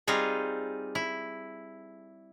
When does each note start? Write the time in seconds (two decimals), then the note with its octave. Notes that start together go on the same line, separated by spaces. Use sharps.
0.07 G3 C4 D#4 F4 G#4
0.95 E4